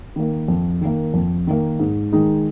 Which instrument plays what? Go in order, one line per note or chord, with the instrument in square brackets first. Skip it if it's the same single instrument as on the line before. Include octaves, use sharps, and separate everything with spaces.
[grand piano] D#3 A#3
F2
D#3 A#3
F2
D#3 A#3
G#2
D#3 G#3 D#4